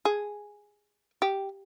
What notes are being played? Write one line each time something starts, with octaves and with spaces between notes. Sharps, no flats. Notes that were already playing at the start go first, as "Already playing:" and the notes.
G#4
G4